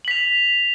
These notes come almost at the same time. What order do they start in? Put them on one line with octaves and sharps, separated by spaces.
F#7 B6 F7